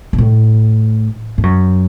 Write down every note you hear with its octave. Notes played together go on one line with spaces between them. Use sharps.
G#2
A2
G#2
F#2